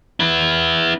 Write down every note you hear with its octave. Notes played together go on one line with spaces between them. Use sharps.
B3 E4